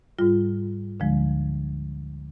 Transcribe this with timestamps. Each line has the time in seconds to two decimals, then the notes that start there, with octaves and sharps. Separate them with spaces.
0.19 G#2 G3 F4
1.00 D2 D3 F3 G#3